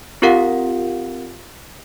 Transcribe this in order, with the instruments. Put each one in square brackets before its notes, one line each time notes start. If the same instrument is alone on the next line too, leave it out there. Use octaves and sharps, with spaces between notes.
[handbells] C4 F4 G4 A#4 F5 F#5